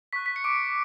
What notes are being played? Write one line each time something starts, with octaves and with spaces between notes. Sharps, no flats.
C#6 F#6 B6
B6
C#7
D6 D7